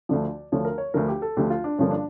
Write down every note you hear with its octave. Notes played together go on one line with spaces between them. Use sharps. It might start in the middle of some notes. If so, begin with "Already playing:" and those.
D2 D3 F3 D5
D2 D3 F3 C#5
A#4
C#5
D2 D3 F3 A#4
G4
A4
D2 D3 F3 G4
F4
D4
G2 D3 F3 A#3 C#4
D4